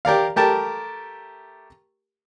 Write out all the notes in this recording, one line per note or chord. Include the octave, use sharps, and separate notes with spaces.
G4 A#4 D5 F5
A3 G4 A#4 A5